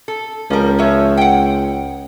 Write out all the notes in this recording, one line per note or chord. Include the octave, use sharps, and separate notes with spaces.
A4
C#2 F3 G3 A#4
F3 C#5 E5
F#5 G5